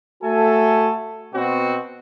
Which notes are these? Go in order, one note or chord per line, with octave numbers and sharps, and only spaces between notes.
A3 F#4 A4 G#5
B2 B3 C4 F#4